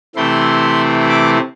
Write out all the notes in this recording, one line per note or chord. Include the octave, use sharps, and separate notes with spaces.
C3 E3 A3 C4 E4 C6
D6